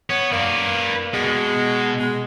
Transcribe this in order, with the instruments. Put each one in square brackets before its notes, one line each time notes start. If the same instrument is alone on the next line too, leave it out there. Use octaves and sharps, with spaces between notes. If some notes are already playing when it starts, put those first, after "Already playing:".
[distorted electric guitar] B3 [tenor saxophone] C#5
[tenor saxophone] A#3 [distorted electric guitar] B4 D5
[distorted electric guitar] B2 [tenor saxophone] G#3
[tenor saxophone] G#3